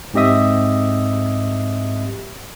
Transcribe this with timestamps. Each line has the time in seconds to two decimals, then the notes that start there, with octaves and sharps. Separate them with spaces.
0.14 G#2 C4 G4 D#5 E5 D#6